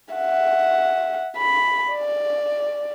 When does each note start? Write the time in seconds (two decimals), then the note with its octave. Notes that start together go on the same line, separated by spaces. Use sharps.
0.14 E5 F#5
1.38 B5
1.91 D5